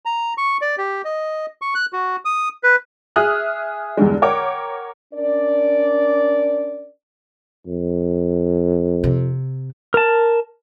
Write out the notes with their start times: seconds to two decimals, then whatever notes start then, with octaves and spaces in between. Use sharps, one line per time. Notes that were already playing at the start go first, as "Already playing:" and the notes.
0.05 A#5
0.38 C#6
0.61 D5
0.78 G4
1.05 D#5
1.62 C#6
1.75 F#6
1.93 F#4
2.25 D#6
2.63 B4
3.16 G#4 E5 D#6 F6 F#6
3.97 E2 G2 D3 G#3
4.22 A#4 C#5 F#5 G5 D6
5.13 C#4 D4 A#4 D5
7.67 F2
9.04 C3
9.94 A#4 A5